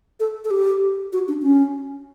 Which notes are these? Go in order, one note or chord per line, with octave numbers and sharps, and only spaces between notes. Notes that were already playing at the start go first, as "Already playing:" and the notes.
A4
A4
G4
F#4
D4
C#4